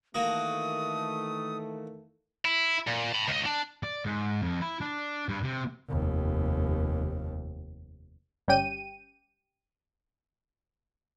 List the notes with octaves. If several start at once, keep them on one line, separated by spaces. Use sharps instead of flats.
D#3 E3 A3 A#3 F#4 D#6
E4
A#2
A5 B5
C#2 D#5
D4
D5
G#2
F2
E4
D4
G2
C3
F1 D#2
G1 G3 C#4 G4 G5 D#7